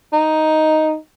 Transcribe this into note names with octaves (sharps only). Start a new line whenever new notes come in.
D#4